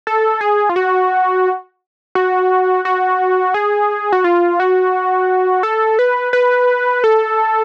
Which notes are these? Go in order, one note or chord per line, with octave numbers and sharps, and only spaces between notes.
A4
G#4
F4
F#4
F#4
F#4
G#4
F#4
F4
F#4
A4
B4
B4
A4